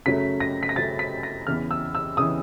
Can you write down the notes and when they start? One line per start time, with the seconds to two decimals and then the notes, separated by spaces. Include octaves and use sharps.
0.06 F#2 C#3 F#3 A3 B6
0.40 A#6
0.63 B6
0.69 A#6
0.76 F#2 C#3 F#3 A3 A6
0.99 B6
1.23 A#6
1.47 E2 C#3 E3 F6
1.71 E6
1.95 E6
2.17 C#3 E3 D#6